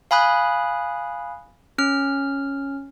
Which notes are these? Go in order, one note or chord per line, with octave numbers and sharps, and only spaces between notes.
F5 G#5 B5 D#6 F#6
C#4 F6